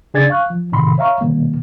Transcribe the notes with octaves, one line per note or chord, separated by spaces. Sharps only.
C#3 D4 G#4 D5 G#6 A6
F5 C#6 F#6
F3
A2 C3 D#3 B5 C6
C#5 E5 F5 A#5 C#6
B2 D#3 G3 A#3